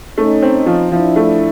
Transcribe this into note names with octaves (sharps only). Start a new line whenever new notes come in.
A3 C#4 D#4
C4
F3
F3 D4 E4
A3